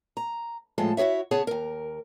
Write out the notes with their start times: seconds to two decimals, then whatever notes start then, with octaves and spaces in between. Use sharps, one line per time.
0.17 A#5
0.78 A2 F3 G#3 A4 A5
0.97 E4 F#4 G#4 C#5 E5
1.31 C#3 B3 G#4 C#5 A5
1.47 D#2 A#4